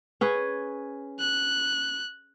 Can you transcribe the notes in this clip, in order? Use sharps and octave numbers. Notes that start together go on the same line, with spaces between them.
C#4 G#4 B4
F#6